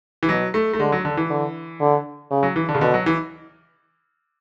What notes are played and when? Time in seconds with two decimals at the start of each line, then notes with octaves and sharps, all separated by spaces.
0.23 E3
0.29 B2 F#3
0.54 A3
0.74 A3
0.79 D3 G#3
0.92 F#3
1.05 D3
1.17 E3
1.30 D3
1.80 D3
2.31 C#3
2.43 F#3
2.56 E3
2.69 D3
2.75 C#3
2.81 B2 D3
2.94 F#3
3.06 E3